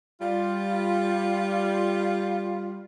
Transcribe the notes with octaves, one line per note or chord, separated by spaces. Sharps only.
G3 F4